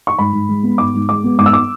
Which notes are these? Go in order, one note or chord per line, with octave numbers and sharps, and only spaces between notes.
C#6
G#2 B5
G#2
G#3
B3
G#2 D6
G#2
G#3 D6
B3
G#2 D6
E6
D6